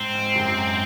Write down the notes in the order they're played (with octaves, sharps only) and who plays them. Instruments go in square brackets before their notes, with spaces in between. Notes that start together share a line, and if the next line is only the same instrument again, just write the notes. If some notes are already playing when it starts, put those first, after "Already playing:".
Already playing: [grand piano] G#2 [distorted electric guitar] C4
[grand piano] G#2
F#2
G#2